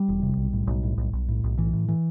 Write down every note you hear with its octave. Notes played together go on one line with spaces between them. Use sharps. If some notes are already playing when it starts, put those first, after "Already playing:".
Already playing: G3
E1
C3
B1
A2
B1
A2
B1
B1
A2
B1
A2 E3
A2
E3